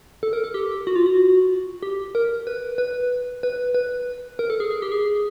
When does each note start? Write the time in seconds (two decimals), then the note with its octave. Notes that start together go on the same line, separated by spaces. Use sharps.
0.23 A4
0.33 A#4
0.44 A4
0.54 G4
0.87 F#4
0.96 F4
1.06 F#4
1.83 G4
2.15 A#4
2.47 B4
2.78 B4
3.43 B4
3.75 B4
4.39 A#4
4.50 A4
4.60 G#4
4.71 G#4
4.82 G4
4.92 G#4